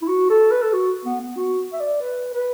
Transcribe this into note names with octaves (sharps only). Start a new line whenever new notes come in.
E4
F#4
A4
B4
A4
F#4
B3
B3
F#4
E5
D5
B4
B4